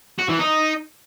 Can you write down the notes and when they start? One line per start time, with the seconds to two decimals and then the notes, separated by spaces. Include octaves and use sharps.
0.19 F#4
0.29 E3
0.39 D#4